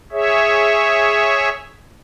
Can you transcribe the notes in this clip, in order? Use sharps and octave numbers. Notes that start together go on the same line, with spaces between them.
G#4 C#5 E5